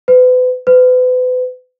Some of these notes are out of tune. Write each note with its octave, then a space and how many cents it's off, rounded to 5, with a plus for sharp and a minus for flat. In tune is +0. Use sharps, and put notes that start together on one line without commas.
B4 +35
B4 +40